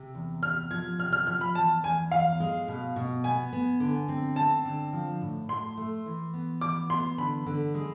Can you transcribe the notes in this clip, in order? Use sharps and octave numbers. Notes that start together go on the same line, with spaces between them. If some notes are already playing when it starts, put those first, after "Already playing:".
Already playing: C3
E2
C3 F6
F3 G#6
C3 F6
F6
F3 F6
B5
E2 A5
E2 G#5
E2 F5
G#3
B2
B2
B3 G#5
B3
D3
C4
C4 A5
D3
F3
A2
A2 C6
A3
E3
B3
E3 D6
B3 C6
D3 B5
D3
G#3